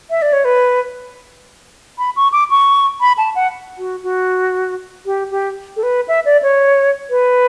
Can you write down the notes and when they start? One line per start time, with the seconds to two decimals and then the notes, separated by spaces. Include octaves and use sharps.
0.10 E5
0.22 D5
0.33 C#5
0.45 B4
1.98 B5
2.16 C#6
2.32 D6
2.50 C#6
3.01 B5
3.18 A5
3.35 F#5
3.78 F#4
4.03 F#4
5.06 G4
5.31 G4
5.76 A4
5.83 B4
6.08 E5
6.25 D5
6.43 C#5
7.10 B4